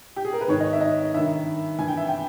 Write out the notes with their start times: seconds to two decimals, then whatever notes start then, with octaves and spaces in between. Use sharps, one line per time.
0.16 G4
0.25 G#4
0.33 A#4
0.41 B4
0.48 G#2 D#3 C#5
0.60 D#5
0.64 C#5
0.73 E5
0.81 D#5
1.13 G2 D#3 E5
1.78 G2 E3 G#5
1.88 G5
1.97 E5
2.07 G5